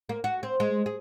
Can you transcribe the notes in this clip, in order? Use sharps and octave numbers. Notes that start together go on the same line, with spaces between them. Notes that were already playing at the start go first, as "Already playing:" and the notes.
A#3
F#4
C4
G#3
G#4